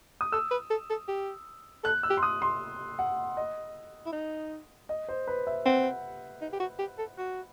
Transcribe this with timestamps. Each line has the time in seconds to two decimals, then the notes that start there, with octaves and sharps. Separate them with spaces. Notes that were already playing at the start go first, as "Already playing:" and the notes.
0.21 D#6
0.32 A4 E6
0.51 B4
0.70 A4
0.90 A4
1.08 G4
1.84 A4 F#6
2.03 E6
2.10 G4
2.17 C6
2.23 D#6
2.42 C6
2.99 F#5
3.37 D#5
4.06 E4
4.13 D#4
4.89 D#5
5.09 C5
5.27 B4
5.47 E5
5.66 C4 F#5
6.41 D#4
6.53 G4
6.60 F#4
6.79 G4
6.99 A4
7.18 F#4